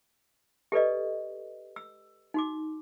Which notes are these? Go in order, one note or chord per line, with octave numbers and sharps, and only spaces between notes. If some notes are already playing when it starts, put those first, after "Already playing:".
G4 A4 B4 D5 D#5
E6
D#4 F#4 D6